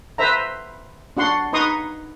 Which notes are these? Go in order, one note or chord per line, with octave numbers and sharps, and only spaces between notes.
B4 C5 E5 A#5
D4 F#4 F#5 C6
D#4 B4 A#5 C6 C#6 D#6